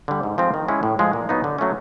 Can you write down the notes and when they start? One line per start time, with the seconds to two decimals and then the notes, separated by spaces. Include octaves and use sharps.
0.08 D3 G3
0.23 G#2
0.38 F3 G#3 C4
0.54 D#3
0.68 G#3 C#4 E4
0.83 A2
0.99 F3 G#3
1.13 A#2
1.29 F#3 B3 D#4
1.44 D3
1.58 F#3 A3 C#4